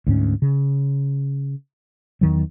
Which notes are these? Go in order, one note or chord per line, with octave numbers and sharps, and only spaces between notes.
D2 G#2 C#4
C#3
E2 D#3 F#3